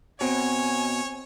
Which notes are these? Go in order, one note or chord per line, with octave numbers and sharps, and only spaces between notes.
B2 C4 C#5 G#5